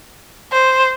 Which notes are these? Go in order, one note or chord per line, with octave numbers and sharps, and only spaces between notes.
C5